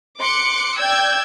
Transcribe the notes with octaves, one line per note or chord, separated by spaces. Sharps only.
C6 D6 F#6 C#7
D5 G5 E6 G6 G#6